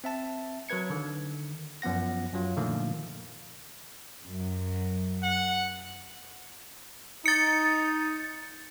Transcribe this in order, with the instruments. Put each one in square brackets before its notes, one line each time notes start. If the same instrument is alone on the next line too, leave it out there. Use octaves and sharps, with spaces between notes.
[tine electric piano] C4 E5 A5
F#3 A#4 B4 G#6 C#7
D3 D#3
F#2 F3 B3 F#5 A#6
F#2 F#3 F4
A#2 D3 D#3 F3 A3 A#3
[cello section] F#2
[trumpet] F#5
[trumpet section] D#4 [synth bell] A6 C#7